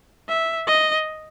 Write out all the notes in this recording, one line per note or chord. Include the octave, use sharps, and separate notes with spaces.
E5
D#5